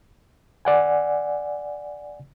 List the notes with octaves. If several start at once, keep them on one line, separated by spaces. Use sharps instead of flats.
D5 F#5 G#5